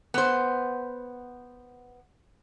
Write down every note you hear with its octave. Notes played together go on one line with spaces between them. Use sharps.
B3 C5